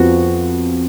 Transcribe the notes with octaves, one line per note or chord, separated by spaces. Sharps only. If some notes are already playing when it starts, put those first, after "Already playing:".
Already playing: F2 F3 B3 F#4